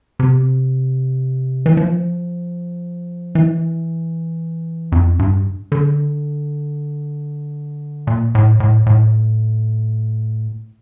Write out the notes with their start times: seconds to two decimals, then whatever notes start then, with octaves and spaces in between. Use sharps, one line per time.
0.19 C3
1.66 E3
1.77 F3
3.35 E3
4.92 F2
5.19 G2
5.72 D3
8.07 A#2
8.35 A2
8.60 A2
8.86 A2